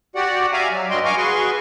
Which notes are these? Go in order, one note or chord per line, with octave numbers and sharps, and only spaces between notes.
F#4 G4 D5 F#5
D5 E5 F5 G#5 A#5
F#3
G2 G3 F#4 D#5 G5 C6
F5 G#5 A#5 C#6 D6 F6
F#4 G#4 B4 C6 C#6